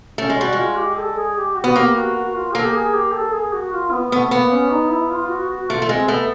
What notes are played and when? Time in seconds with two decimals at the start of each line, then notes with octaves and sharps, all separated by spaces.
0.18 A3 C#4
0.30 G#3
0.38 G3 F#4
0.53 G#3 F4
0.77 G4
0.97 A4
1.17 G#4
1.37 G4
1.56 F#4
1.64 B3
1.76 A#3 G4
1.95 F#4
2.15 F#4
2.35 F4
2.54 A#3 A4
2.65 G4
2.74 G#4
2.94 G4
3.13 A4
3.33 G#4
3.53 F#4
3.72 F4
3.92 B3
4.11 A3 B3
4.31 A#3 B3
4.51 C#4
4.71 D#4
4.90 E4
5.10 F4
5.22 F4
5.30 F#4
5.50 F#4
5.69 A3 F4
5.82 A3
5.89 G#3 C4
6.08 A3 B3